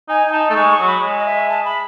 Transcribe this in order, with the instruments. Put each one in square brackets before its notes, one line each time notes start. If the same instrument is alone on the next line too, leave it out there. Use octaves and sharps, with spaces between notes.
[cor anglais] D#4 [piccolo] G#5
[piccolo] G#5
[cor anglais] D#4 [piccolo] A5
[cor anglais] A3
[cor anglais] G#3 [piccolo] C#6
[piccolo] C#6
[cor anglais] F#3
[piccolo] B5
[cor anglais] G#3
[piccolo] D#5
E5
A5
B5